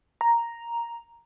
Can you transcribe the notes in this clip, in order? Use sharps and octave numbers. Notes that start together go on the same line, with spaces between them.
A#5